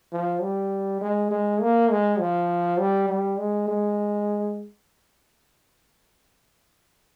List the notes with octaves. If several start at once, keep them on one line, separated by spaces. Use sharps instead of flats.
F3
G3
G#3
G#3
A#3
G#3
F3
G3
G3
G#3
G#3